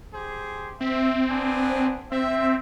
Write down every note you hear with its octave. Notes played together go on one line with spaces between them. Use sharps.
G4 G#4 C5
C4 E5
B3 D4 G#5
C4 E5